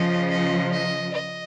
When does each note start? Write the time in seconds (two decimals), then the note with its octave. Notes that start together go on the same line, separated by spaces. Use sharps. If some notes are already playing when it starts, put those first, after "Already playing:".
Already playing: C#3 F3 D#5
0.30 D#5
0.72 D#5
1.14 D#5